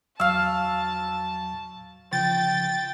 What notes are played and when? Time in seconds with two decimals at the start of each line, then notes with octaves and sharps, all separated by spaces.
0.20 E2 F#3 F5 A5 C#6 E6
2.13 C#3 F3 G5 A6